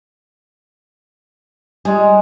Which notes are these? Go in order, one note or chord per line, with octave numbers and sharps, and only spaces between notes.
G3 G#3 G#4